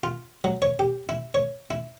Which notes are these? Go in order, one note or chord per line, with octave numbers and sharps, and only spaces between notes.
F4
F#3
C#5
G4
E4
C#5
E4